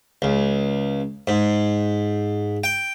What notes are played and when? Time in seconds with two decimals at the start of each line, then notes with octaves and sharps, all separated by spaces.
0.22 C#2
1.28 G#2
2.64 G5